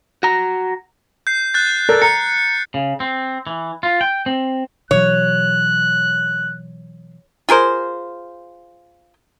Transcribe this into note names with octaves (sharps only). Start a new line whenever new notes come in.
F#4 A#5
G6 C7
F#6 G6 A6
A4 A#4 D5
A#5 C#7
C#3
C4
E3
F4
G5
C4
B2 E3 F#3 C#5 F#6
F4 G#4 A#4 C5